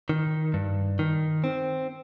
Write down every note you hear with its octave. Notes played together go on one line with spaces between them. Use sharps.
D#3
G2
D#3
C4